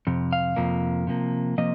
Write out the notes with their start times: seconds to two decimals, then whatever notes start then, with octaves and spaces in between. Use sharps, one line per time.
0.07 F2 C3
0.33 F5
0.56 F2 C3 F3 A#3
1.07 C3 F3 A#3
1.58 C3 F3 A#3 D#5